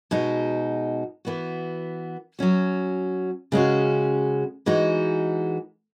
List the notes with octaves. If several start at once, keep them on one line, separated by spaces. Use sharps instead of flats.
B2 G#3 D#4 F#4
E3 B3 F#4
F#3 C#4 F#4
C#3 G#3 C#4 F#4
E3 G#3 D#4 F#4